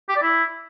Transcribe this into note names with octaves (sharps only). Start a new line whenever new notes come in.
G4
D5
E4